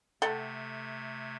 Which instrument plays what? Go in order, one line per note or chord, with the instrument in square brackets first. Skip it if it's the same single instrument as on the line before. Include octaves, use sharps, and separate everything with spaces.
[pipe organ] C3 A3 G#6 [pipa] A4 F#5 G5